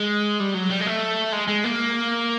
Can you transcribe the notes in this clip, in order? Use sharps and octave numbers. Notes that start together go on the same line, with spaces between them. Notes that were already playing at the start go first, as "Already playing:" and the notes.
Already playing: G#3
G3
F#3
G3
G#3
A3
G#3
G#3
A#3